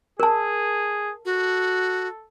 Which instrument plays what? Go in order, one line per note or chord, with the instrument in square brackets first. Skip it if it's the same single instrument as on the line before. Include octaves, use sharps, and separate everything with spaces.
[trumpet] G#4 [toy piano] A#4 A5
[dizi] F#4 [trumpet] A4